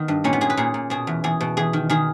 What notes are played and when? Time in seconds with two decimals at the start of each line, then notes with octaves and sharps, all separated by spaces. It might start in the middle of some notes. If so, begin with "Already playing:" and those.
Already playing: D#3 B3
0.08 G2
0.24 A#2 C#4
0.33 B3
0.41 A#2 G#4
0.50 B4
0.57 A#2 G#4
0.74 A#2
0.90 B2 G#4
1.07 E2
1.24 E2 G#4
1.41 B2
1.57 E2 G#4
1.73 D#3
1.90 D#3 G#4